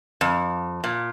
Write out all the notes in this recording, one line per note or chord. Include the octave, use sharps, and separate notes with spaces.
F2
A#2